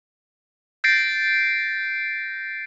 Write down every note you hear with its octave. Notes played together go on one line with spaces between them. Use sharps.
G6 A6 A#6 C7 D7